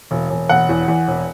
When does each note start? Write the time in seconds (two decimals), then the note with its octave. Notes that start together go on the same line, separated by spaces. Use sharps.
0.11 E1
0.30 E1
0.49 E1 F#5
0.69 E2
0.88 E2
1.08 E1